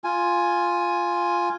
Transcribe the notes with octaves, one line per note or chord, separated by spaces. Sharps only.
F4 G#5